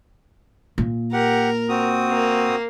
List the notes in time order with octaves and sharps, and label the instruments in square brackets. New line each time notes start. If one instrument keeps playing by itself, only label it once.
[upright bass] A#2
[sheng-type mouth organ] G4 F#5 [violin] A#4
[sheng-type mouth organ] C4 F#4 D#6
[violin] A#3